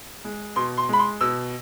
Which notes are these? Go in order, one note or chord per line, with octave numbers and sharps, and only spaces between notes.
G#3
B2 C6
C6
G#3 B5
C6
B2 E6